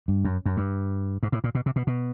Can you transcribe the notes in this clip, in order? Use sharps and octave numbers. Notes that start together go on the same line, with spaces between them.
G2
F#2
F#2
G2
G#2
A2
A#2
B2
C3
B2
B2